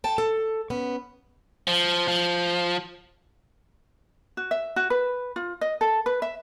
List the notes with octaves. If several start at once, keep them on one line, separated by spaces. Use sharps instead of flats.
A4 G5 A5
A4
B3 C#4
F3
F3
F#4
E5
F#4
B4
F4
D#5
A4
B4
E5